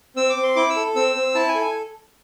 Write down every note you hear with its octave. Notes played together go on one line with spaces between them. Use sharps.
C4 E6
D6
C4
C6
E4 D6
E6
A4
C4 E6
C4
E4 A5
G#5
A4
G#5